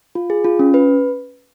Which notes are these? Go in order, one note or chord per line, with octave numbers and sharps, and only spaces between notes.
F4
G#4
F4
C#4
B4